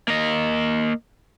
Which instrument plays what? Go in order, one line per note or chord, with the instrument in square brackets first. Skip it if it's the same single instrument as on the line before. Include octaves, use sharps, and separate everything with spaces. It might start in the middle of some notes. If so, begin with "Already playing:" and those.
[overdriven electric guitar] A#3 D#5